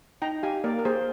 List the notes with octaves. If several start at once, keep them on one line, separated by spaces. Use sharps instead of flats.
D#4 G5 A#5
G4 F5 G#5
A#3 A#4 D5
A#4
A#3 G#4 C5